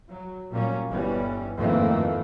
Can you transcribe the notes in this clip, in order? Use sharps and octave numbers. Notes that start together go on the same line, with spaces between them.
F#3
A#2 F#3 G3 A#3 C#4
G1 E3 G3 C#4
F2 G#2 D#3 E3 A3 A#3